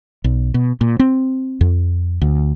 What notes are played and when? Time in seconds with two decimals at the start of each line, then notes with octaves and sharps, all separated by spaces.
0.24 B1
0.54 B2
0.81 A#2
0.99 C4
1.61 F2
2.22 D2